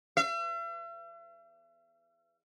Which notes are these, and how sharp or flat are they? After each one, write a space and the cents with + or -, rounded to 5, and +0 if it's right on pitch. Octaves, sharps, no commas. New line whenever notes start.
E5 +45